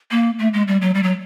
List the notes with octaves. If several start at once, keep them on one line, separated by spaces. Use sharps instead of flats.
A#3
A3
G#3
G3
F#3
G3
F#3